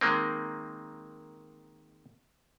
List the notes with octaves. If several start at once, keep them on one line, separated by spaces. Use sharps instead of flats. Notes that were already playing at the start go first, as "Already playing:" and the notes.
D#3 G#3 A#3 C4